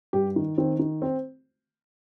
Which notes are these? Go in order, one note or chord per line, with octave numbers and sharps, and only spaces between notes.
G2 G4
D#3
D#3 C4
D#3
C4